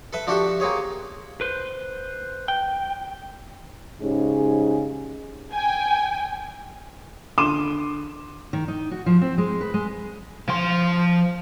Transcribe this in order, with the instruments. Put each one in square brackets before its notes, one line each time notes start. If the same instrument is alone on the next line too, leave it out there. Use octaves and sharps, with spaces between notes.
[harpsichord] A4 B4 E5
F3 D4 F#4 G4 A4 E5
A#3 C4 G#4 C#5
[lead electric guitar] B4 C5
G5
[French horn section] G#2 C#3 C#4 D#4 G4 G#4
[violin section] G5 G#5
[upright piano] D3 C6 D6 D#7 E7
[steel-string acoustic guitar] D#3
D#4
F#4
F3
C4
G#3
B4
G#3
[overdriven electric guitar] F3 C6